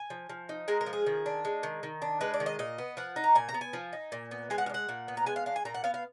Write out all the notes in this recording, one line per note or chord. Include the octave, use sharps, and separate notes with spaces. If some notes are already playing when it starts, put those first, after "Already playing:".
Already playing: G#5
F3
F3
D#4
G#3 A#4
A#4
F3
G#4
D#3
D4
G#3
D#3
D#3
D4
G#3 B4
D5
D#3
D#5
A#2 D#5
B3
F3 F#5
D#4
A#5
A#2 G#5
A#5
B3
G#5
F3
D#4
A#2
B3
G#3 G#5
F#5
F5
D4
F#5
A#2
B3
A#5
G#3 G#5
F5
D4 F5
G#5
A#2 A#5
F#5
B3 F5
F5